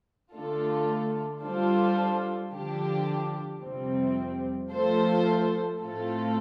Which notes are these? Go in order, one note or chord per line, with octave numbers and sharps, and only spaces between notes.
D3 A3 D4 F4 A4
G3 D4 F4 A4 C5
D3 F3 D4 G4
F2 C3 G3 C4
F3 A3 F4 A4 C5
A2 A3 C4 F4 A4